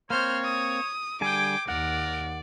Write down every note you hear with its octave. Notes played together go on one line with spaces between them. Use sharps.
A#3 C4 C5 C#5 F6
D#6
D3 G3 G#4 G5 G#5 D6
D#2 A#4 D5 F#5